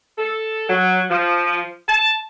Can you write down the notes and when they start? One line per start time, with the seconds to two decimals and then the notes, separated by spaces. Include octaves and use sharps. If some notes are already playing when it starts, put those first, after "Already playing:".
0.18 A4
0.69 F#3
1.10 F3
1.87 A5